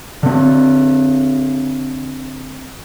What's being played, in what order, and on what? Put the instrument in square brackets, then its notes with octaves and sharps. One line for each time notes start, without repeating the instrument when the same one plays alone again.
[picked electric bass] D3 C4